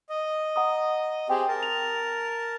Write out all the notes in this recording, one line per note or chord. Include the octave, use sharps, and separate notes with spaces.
D#5
F#5 A#5 D#6
C4 G4 G#4 G5
A#4 A5
F7